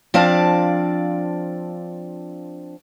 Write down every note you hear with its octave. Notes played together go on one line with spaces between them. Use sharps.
F3 C4 D4 D5 F5 A5